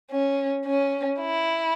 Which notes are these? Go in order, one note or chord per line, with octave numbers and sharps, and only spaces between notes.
C#4
C#4
E4